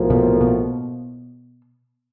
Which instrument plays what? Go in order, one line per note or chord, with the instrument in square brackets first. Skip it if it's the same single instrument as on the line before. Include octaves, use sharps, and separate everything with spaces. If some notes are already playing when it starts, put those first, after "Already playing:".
Already playing: [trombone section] B1 A2 F3 A#3
[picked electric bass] B2
B2